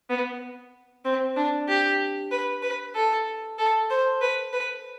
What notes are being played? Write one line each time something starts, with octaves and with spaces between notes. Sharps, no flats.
B3
C4
D4
G4
B4
B4
A4
A4
C5
B4
B4